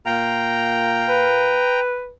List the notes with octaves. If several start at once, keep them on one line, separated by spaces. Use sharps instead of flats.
A#2 F5 G5 A#5
B4